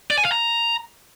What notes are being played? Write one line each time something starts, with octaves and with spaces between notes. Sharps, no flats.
D5
G#5
F5
A#5